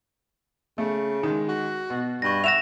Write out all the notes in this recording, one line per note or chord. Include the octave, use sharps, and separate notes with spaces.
C#3 A3
D#3 G#3
F#4
B2
G2 C#6 A#6
E5 F#5 A#6 E7 F7